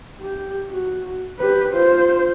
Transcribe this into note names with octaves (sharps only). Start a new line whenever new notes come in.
G4
F#4
G4 B4
F4 C5